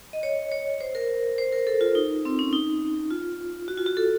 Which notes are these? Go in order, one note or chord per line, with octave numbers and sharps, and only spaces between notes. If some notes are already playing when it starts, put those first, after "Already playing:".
D#5
C#5
C#5
C5
A#4
C5
A#4
A4
F4
D#4
C4
C#4
D#4
F4
F#4
F4
F#4
A4